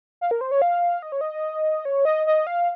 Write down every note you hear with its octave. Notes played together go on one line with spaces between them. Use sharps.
F5
A#4
C5
C#5
F5
D#5
C#5
D#5
C#5
D#5
D#5
F5